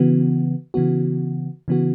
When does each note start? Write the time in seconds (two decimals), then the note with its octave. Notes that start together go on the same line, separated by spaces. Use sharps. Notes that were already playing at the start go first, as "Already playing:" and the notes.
Already playing: C#3 E3 B3 F#4
0.74 C#3 E3 B3 F#4
1.68 C#3 E3 B3 F#4